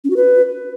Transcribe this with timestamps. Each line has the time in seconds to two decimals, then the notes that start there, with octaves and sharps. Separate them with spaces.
0.04 C#4
0.10 F#4
0.16 B4